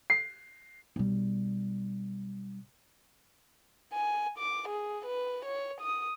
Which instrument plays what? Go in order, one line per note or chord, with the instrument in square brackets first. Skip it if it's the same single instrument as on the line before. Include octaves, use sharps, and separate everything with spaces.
[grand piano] C7
[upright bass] B1 G3
[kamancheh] G#5
D6
G#4
B4
C#5
D#6